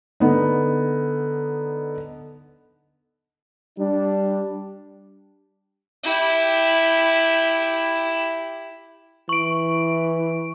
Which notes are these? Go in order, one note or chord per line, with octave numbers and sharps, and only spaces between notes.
D3 B3 D#4
G3 D4
E4 G4
E3 C#6 D7